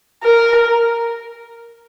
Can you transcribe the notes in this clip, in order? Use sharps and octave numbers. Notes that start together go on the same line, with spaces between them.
A#4